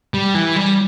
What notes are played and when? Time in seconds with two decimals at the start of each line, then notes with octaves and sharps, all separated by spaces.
0.14 G3
0.35 E3
0.56 G3